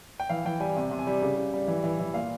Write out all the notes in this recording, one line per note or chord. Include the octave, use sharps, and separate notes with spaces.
G5
E3 F5
E3 G5
G3 G#5
C3
C3
G#5
G3
C#3
C#3
G3
E3
E3
E3
A#2 F5